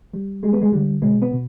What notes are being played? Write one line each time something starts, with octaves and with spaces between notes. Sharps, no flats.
G3
G3 G#3
B3
G#3
D3 G3
B2 G#3
B3
B2